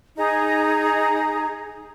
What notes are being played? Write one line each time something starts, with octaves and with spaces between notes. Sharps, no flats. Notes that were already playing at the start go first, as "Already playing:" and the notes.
D#4 G#4 A#5